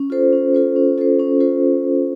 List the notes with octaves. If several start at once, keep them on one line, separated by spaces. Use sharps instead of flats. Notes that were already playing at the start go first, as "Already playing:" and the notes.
Already playing: C#4
F4 A4 C5
C#4
F4 A4 C5
C#4
F4 A4 C5
C#4
F4 A4 C5